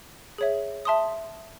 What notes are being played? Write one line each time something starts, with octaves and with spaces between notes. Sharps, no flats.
G#4 C#5 E5
E5 A5 C6 D#6